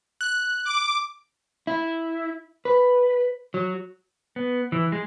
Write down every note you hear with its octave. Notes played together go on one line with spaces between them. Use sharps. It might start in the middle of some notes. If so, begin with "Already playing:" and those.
F#6
D6
E4
B4
F#3
B3
E3
G#3